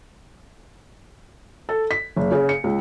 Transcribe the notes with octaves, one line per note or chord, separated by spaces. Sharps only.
A4
B6
F#1
C#3
C#7
C#2